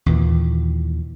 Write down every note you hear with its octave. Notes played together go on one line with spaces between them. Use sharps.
D#2 A#2 E3